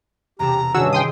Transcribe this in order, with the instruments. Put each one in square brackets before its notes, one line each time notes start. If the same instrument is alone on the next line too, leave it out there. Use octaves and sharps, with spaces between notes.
[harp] E1 C3 A4 [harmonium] G4 [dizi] A#5
[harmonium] G2 C#4 D4 [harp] D#3 E4 G#4 [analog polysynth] F#4 E6
[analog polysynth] G5 C6 D#6